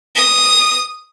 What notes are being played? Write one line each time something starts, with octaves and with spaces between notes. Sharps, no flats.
D#6